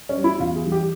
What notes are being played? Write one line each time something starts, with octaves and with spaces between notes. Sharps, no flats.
C#4
G3
E4
E2 F4
G#4
E3 G3
G4